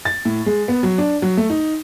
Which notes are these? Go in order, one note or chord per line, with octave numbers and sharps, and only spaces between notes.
A6
A2
G#3
B3
F#3
D4
F#3
A3
D#4